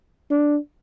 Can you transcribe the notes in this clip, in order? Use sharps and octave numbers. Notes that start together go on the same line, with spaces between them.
D4